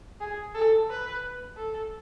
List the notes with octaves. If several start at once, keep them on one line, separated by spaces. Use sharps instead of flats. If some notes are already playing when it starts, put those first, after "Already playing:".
G#4
A4
B4
A4